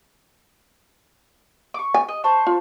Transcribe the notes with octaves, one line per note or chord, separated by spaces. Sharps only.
C#6 D6
G#5
D#5
C5 A5 C#6
F4